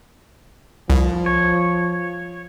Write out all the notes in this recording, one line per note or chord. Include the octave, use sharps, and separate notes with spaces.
C2 F3
C#5